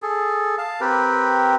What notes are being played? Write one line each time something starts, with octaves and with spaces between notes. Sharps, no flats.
G#4 A4
F5 A5
C4 G4 A#4 B4